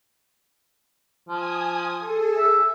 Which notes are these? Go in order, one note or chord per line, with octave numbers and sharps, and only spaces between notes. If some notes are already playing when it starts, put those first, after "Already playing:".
F3 G#5 D#6
G#4 A4
E5